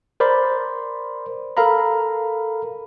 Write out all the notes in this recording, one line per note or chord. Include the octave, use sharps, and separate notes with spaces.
A#4 C5 D5 B5 C6
A4 A#4 F5 A#5 B5